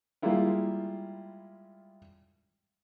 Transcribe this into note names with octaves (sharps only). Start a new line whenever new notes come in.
G3 G#3 A#3 E4 F4